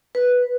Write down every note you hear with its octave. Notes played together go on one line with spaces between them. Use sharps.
B4